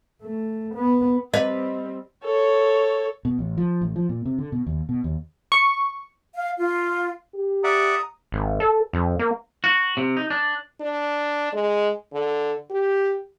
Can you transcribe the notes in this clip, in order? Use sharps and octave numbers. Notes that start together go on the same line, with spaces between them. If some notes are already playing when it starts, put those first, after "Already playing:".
A3
B3
G3 C4 B4 D#5
A4 C#5
B2
A1
F3
A1
F3
A#2
C3
D3
B2
D#2
B2
D#2
C#6
F5
F4
G4
D5 E5 F#5 A#5 D#6
G#1
A4
F2
A#3
F#4
C3
D#4
D4
D4
G#3
D3
G4